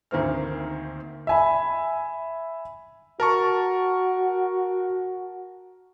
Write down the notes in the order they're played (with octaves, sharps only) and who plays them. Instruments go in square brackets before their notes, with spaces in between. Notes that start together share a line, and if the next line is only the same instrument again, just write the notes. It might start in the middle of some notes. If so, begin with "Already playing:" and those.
[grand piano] D2 D#3 A#3 C4 F6
[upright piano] E5 G#5 B5
[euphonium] F#4 [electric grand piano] A#4 A5 C#6